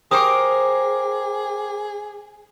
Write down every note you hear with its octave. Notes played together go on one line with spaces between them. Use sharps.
G4 G#4 A#4 C5 G5 D6 D#6